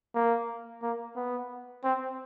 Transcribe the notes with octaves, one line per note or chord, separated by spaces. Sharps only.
A#3
A#3
B3
C4